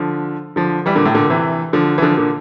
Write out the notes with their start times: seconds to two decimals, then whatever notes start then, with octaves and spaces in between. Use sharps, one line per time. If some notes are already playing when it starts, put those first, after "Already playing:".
Already playing: D3 F3
0.56 D3 F3
0.86 E3 G3
0.96 A#2 D3
1.06 A2 C3
1.15 A#2 D3
1.29 C3 E3
1.73 D3 F3
1.98 E3
2.02 D3 F3
2.17 A#2 D3